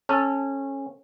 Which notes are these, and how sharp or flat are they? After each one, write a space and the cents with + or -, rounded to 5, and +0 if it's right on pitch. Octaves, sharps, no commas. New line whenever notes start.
C#4 -20 A4 +0